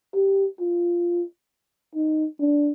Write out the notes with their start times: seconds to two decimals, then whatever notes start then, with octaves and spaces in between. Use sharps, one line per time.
0.15 G4
0.60 F4
1.95 D#4
2.40 D4